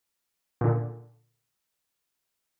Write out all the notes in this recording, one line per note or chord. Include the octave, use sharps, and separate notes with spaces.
A#2 D3